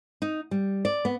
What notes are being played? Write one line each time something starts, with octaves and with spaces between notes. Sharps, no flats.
D#4
G3
D5
B3